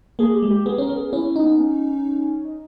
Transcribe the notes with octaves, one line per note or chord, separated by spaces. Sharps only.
A#3 G#4
G4
G#3
G4
B3 G#4
C#4 A#4
B3
G#4
C#4 E4
D#4
B3
C#4
D#4